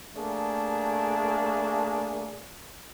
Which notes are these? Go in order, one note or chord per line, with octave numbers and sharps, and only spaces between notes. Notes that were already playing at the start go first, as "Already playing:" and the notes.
A3 A#3 D4 G#4